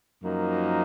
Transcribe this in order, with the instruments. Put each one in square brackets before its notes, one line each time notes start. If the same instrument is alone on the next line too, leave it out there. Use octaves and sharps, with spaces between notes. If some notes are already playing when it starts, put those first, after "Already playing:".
[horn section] F#2 F3 A#3 D#4